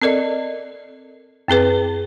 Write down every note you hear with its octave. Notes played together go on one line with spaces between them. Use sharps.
C4 A4 A#4 D5 D#5
F#2 C4 G#4 B4